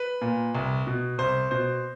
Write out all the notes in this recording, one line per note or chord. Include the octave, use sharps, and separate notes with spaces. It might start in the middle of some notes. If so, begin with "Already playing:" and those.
Already playing: B4
A#2
C2
B2
C2 C5
B2 C5